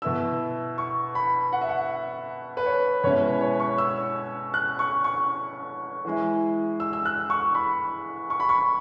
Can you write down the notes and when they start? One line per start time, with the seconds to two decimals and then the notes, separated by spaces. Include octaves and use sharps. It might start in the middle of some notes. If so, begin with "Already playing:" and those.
0.02 B2 B3 E4 E6
0.78 C#6
1.15 B5
1.53 F#5
1.61 E5
1.69 F#5
2.57 B4
2.66 C#5
3.04 B2 G#3 C#4 E4 C#5
3.22 B4
3.41 C#5
3.60 C#6
3.78 E6
4.54 F#6
4.79 C#6
5.04 C#6
6.05 E3 G#3 E4
6.80 E6
6.93 E6
7.05 F#6
7.30 C#6
7.55 B5
8.30 C#6
8.40 B5
8.49 C#6